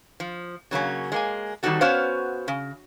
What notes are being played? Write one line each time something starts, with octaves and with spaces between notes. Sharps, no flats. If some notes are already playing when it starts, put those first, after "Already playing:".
F3
C#3 F#3 A#3 C#4
G#3 A#3 G#5
D#3 G3 C4 D#4 F#4 A4
B3 C#4 F#4 C5 C#5 F5
C#3